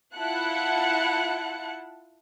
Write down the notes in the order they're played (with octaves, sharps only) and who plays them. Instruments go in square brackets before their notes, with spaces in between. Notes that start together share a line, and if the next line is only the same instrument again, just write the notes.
[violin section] E4 F4 F#5 A5 F#6 C#7